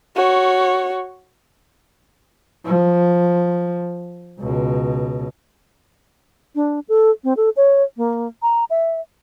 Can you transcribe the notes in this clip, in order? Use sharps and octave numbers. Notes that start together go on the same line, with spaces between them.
F#4 C#5
F3
C#2 B2
D4
A4
C4
A4
C#5
A#3
A#5
E5